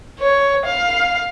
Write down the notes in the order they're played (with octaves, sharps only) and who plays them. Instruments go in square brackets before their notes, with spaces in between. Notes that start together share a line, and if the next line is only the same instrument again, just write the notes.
[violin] C#5
F5